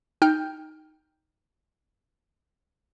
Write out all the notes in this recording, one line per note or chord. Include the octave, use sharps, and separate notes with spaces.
D#4 G5 F6 G6